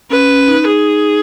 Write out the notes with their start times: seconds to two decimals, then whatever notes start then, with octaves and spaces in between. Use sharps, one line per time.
0.10 C#4 B4
0.29 C#4
0.48 D#4
0.66 G#4